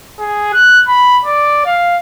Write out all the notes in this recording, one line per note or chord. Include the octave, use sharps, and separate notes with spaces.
G#4
F#6
B5
D5
F5